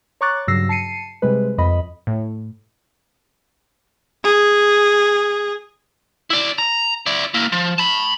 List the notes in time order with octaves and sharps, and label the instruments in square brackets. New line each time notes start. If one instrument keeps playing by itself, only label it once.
[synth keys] C#5 A#5 C#6 D6 F#6 A6
G2 C#3 F#3 E6 A#6 C7
A5 C7 C#7 D#7
C3 G3 G#3 B4
F2 D#5 B5
[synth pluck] A2
[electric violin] G#4
[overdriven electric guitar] E4 D5
A#5
E4 D5
A#3 E4
F3
A5 B5